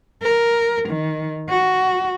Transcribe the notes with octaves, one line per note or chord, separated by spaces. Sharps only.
A#4
D#3
F#4